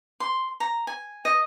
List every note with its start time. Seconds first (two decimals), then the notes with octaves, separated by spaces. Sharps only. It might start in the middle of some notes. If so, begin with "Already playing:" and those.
0.20 C6
0.60 A#5
0.87 G#5
1.25 D#5